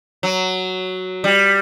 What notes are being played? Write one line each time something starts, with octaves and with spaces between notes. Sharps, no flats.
F#3
G3